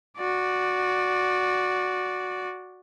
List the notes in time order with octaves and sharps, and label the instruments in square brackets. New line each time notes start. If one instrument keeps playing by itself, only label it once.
[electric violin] F#4 D5